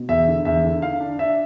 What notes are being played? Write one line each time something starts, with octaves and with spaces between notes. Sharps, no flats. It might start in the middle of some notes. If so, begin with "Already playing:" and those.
Already playing: B2
E2 E5
D3
E2 E5
D3
D3 F5
D4
D4 E5